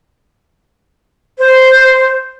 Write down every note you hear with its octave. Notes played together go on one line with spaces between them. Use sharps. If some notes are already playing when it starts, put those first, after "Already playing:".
C5